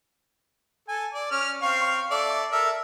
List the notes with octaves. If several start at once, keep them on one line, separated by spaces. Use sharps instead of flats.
A4 G#5
D5
C#4 F6
C4 F5 C#6
A4 D5 E5
A4 A#4 E5